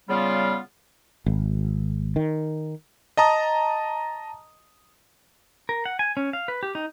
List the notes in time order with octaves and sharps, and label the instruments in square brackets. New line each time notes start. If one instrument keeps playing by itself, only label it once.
[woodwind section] C#3 G3 B3 F4
[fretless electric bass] G#1
D#3
[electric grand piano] D#5 A5 A#5 D#6
[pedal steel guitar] A#4
F#5
G#5
C#4
F5
B4
G4
D#4